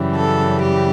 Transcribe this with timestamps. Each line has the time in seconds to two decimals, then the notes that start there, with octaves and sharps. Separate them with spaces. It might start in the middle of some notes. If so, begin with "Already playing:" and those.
Already playing: F#2 C#3 E3 G3
0.16 A4
0.62 G4